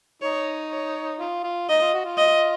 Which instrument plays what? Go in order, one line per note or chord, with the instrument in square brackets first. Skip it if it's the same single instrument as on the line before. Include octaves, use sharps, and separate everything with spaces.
[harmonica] D#4 [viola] C#5
[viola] C#5
[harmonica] F4
F4
[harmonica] D#4 [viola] D#5
[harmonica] F4
F#4
F4
[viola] D#5